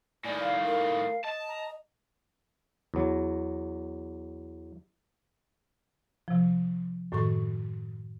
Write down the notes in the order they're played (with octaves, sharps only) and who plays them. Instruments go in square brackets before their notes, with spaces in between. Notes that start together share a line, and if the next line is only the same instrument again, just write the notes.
[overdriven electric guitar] A2 D#3 [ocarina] D5 [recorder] G#5
[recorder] F5
[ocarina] A#4
[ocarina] D#5 [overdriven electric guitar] A5
[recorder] A#5
[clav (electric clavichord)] E2 F#3
[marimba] C3 F3
F#2 A2 D#3 A4 C#6